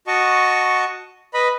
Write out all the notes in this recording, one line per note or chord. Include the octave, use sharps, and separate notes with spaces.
F#4 D#5 A5 C#6
B4 D#5 B5